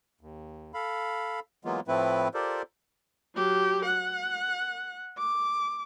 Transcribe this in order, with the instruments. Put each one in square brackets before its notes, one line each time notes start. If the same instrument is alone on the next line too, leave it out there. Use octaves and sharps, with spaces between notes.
[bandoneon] D#2
A4 F5 B5
E3 F#3 G#3 A#3 B3 F4
A2 F3 A3 C4 E4 B4
F4 G4 A4 A#4 C5 D5
[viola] F#3 G4
F#5
D6